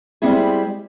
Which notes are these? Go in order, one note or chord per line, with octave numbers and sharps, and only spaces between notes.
G3 G#3 C4 E4 G#4